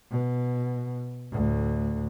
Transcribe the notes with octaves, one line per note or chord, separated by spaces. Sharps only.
B2
D2 A2